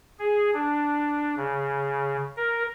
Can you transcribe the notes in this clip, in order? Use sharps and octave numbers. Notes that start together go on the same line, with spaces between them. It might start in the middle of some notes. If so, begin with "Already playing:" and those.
G#4
D4
C#3
A#4